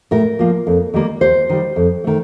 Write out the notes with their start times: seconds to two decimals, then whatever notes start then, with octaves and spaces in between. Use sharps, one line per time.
0.11 A2 A#4
0.39 F3 A#3
0.67 F2
0.94 D#3 G3 A#3
1.21 D#2 C5
1.49 D#3 G3
1.76 F2
2.04 D#3 A3